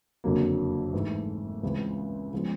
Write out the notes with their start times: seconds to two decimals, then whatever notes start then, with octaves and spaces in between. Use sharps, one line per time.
0.24 F#1 F2 D3 F#3 A#3
0.93 G#2 E3 A3
1.63 C#2 C#3 E3 G#3 C4
2.33 C#3 F3 G#3 B3